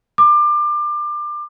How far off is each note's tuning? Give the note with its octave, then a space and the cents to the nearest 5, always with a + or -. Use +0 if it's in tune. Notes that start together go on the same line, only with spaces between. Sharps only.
D6 +25